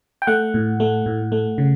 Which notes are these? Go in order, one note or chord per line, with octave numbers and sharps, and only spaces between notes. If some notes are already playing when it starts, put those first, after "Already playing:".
G5
A3 F#5
A2
A3
A2
A3
C#3